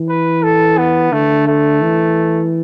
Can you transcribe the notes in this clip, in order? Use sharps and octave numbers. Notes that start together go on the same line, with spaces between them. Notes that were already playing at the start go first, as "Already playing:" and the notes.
Already playing: E3
B4
A4
B3
D3 A3
A3
E3